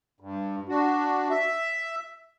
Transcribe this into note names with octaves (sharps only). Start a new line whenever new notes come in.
G2
D4 F#4
E5